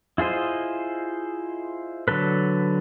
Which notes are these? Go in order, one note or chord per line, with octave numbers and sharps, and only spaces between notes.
E4 F4 G#4 C5 D#5
D3 F#3 A4 B4